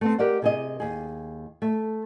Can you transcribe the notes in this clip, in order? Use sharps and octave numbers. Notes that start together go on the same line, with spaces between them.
A3 B3 C4
G4 A#4 D5 D#5 F#5
C3 G#4 D#5
D#2 G#4
A3